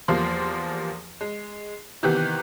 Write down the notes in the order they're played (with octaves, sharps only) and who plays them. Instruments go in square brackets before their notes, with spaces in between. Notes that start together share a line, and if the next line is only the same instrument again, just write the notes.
[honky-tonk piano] E2 F3 G3 A#3 F5 C6
G#3
C3 D#3 E3 B3 G4 F#6